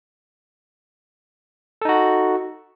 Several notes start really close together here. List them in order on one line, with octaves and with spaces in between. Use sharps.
A4 D#4 F#4